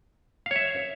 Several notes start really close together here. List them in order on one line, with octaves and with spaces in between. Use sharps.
F5 C#5 E5